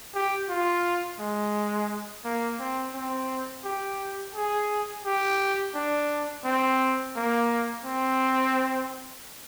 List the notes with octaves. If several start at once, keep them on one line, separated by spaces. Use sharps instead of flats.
G4
F4
G#3
A#3
C4
C4
G4
G#4
G4
D4
C4
A#3
C4